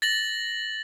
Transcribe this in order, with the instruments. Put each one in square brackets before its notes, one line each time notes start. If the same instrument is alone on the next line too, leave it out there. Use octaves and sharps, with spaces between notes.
[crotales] A6 A#6 F#7